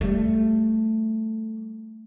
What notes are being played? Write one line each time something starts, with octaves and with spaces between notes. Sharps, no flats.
G3 A3